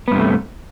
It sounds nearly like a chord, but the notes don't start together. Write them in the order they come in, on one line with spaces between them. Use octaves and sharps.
B3 G2 C3 A3